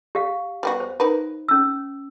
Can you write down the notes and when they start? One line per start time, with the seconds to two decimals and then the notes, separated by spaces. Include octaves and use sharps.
0.15 G4 F5
0.63 G3 B3 F#4
0.80 C5
1.00 D#4 A#4 B4
1.48 C#4 E6